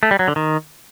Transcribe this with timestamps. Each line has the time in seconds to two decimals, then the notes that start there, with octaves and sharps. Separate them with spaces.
0.03 A3
0.11 G3
0.19 F#3
0.28 D3
0.36 D#3